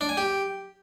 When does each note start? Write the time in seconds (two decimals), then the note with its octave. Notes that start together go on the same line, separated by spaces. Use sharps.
0.01 D4
0.09 G#5
0.17 G4